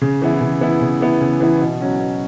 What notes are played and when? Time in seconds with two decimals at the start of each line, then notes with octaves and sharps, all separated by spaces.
0.01 C#3
0.22 E3 B3 E4
0.41 C#3
0.61 E3 B3 E4
0.81 C#3
1.01 E3 B3 E4
1.21 C#3
1.40 E3 B3 E4
1.61 B2
1.81 F#3 C#4 F#4
2.00 B2